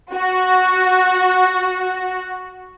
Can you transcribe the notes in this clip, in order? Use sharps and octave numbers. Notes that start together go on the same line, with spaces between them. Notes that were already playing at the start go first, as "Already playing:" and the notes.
F#4